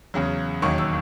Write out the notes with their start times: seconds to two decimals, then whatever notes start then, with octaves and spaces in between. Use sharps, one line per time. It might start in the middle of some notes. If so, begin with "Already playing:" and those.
0.14 E2 C#3 F#3
0.62 E1 D#2 D#3 F#3 C#6
0.78 E6